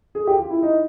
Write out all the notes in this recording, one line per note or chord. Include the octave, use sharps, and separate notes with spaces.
G#4
G4
F4
E4
D#4